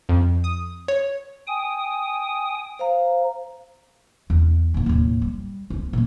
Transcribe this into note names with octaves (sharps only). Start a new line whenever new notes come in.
F2
D#6
C#5
G5 G#5 D#6
C5 F5 A#5
E2
G#2 A#3
D#2 A2
G3
D2 B3
A#2 E3